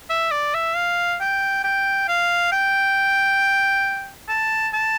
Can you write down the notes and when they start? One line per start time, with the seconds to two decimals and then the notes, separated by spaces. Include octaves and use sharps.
0.10 E5
0.31 D5
0.54 E5
0.76 F5
1.21 G5
1.64 G5
2.08 F5
2.52 G5
4.29 A5
4.73 A5